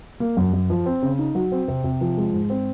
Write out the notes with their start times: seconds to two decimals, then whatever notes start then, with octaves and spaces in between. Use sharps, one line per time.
0.20 A#3
0.37 F#2
0.53 F#2
0.70 F3
0.86 C4
1.02 C#3
1.19 D#4
1.35 F#3
1.52 C4
1.68 C3
1.84 C3
2.01 F3
2.18 G#3
2.33 G#2
2.50 C4